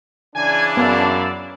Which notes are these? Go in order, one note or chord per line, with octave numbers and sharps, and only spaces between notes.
C#3 E3 D4 G#5
F#2 B3 E4 D5 F5